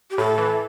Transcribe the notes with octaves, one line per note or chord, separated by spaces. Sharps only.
G4
A2 A4
E3